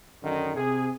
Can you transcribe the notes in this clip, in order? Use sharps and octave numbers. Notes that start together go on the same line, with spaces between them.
F#2 D3 D#3 D#4
C3 G#4